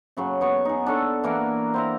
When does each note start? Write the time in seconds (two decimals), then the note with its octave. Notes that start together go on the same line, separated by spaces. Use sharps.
0.17 F#2 C#3 F#3
0.41 B3 C#6
0.65 D#4 G#4
0.86 D4 A4 C#6
1.24 E3 A#3 A#4 F#5
1.74 C4 E4 A#5